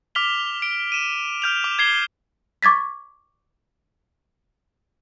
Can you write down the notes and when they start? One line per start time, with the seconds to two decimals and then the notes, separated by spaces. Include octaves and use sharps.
0.15 D6 F6 B6 F7 G7
0.62 D7
0.92 D#7 E7
1.42 F6 G6 F7
1.64 D6
1.79 G#6 C7 G7
2.63 C#6 D6 G#6 A6 B6